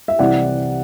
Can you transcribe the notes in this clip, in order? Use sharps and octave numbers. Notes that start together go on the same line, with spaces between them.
E5
C2 C3 E3 D5 F#5